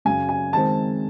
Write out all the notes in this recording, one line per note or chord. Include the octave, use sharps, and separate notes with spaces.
F#2 C#3 F#3 C#4 G#5
G#5
D#3 G#3 C4 A5